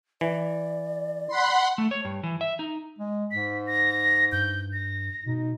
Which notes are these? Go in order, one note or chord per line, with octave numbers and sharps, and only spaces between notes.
E3 D5
F#5 B5 C6
A3
C#5
G2
E3
E5
D#4
G#3
G#2 B6
A#6
G2 G6
A#6
B2 D#4